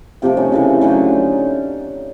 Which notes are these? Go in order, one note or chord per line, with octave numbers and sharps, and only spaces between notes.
C3 F3 A3 G4 A4
C#4 D#4
C#3 E3 A3
D3 F#3 A3 C#4 D#4